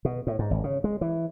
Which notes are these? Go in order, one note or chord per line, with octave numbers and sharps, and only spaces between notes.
B2
A2
G#2
G#1
C#3
G#3
E3